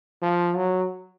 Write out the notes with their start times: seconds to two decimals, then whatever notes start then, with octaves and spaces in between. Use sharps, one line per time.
0.22 F3
0.56 F#3